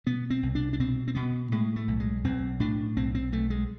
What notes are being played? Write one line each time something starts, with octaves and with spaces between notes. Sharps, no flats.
B2 B3
C4
C2
D4
D4
B2 C4
C4
B2 B3
A2 G#3
A3
B1
G#3
B1 C4
A2 D4
B1 C4
C4
B1 A3
G#3